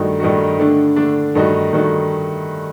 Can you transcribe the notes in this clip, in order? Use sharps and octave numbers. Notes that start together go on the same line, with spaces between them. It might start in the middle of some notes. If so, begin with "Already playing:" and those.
Already playing: G2 D#3 A3 D#4 F#4
G2 D#3 A3 D#4 F#4
D3 A3 D4
D3 A3 D4
G2 D#3 A3 D#4 F#4
G2 D#3 A3 D#4 F#4